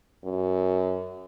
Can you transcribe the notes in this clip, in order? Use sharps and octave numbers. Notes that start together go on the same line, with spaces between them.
F#2